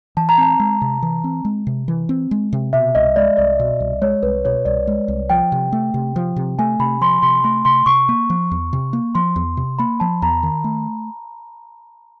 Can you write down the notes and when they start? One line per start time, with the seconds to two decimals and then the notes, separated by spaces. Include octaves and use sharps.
0.17 E3 A5
0.29 A#5
0.38 C4 A5
0.60 G#3
0.82 C3
1.02 E3
1.24 C4
1.45 G#3
1.67 C3
1.88 E3
2.09 C4
2.31 G#3
2.53 C3
2.73 B2 E5
2.95 C2 D#5
3.16 G#3 D5
3.37 C2 D5
3.59 B2
3.80 C2
4.02 G#3 C#5
4.23 C2 B4
4.45 B2 C#5
4.65 C2 D5
4.87 G#3
5.08 C2
5.30 F3 G5
5.52 C3
5.72 A3
5.94 C3
6.16 F3
6.36 C3
6.59 A3 G#5
6.79 C3 B5
7.01 F3 C6
7.22 C3 C6
7.44 A3 C6
7.65 C3 C6
7.86 C3 C#6
8.09 A#3
8.30 F3
8.51 E2
8.73 C3
8.93 A#3
9.15 F3 C6
9.36 E2
9.57 C3
9.79 A#3 B5
10.00 F3 A5
10.22 E2 A#5
10.43 D#3
10.64 A3